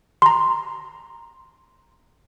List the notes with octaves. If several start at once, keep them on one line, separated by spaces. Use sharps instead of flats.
A#5 C6